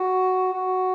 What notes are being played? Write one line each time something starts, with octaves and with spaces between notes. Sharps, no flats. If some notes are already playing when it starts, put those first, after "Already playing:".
Already playing: F#4
F#4